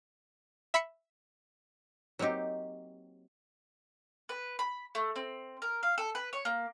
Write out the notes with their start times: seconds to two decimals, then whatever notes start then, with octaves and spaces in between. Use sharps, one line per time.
0.74 E5 B5 B6 C#7
2.19 F#3 A#3 C4 D#4 G4
4.29 B4
4.59 B5
4.95 A3
5.16 C4
5.62 A#4
5.83 F5
5.98 A4
6.15 B4
6.33 C#5
6.45 A#3